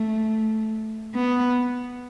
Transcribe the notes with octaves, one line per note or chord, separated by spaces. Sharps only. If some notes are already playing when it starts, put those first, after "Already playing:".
Already playing: A3
B3